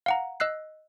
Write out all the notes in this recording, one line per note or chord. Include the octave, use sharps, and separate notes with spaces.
F5 F#5 A#5
D#5 E6 F#6 C7